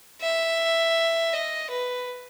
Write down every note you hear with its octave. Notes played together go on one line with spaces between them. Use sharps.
E5
D#5
B4